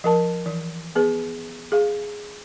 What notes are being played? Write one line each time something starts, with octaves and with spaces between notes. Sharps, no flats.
F3 A#4 A5
E3
B3 G#4 B4
G#4 F5